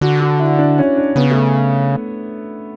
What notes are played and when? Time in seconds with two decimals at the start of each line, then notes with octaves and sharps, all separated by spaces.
0.01 D3 F#4
0.20 F#4
0.40 E4
0.59 D4
0.78 C#4
0.97 D4
1.16 C#3 B3
1.31 A3